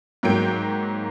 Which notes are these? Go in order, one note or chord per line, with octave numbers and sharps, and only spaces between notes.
G#2 F#3 A#3 G5 D7